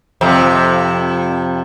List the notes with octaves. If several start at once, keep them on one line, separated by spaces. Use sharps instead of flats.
F2 C3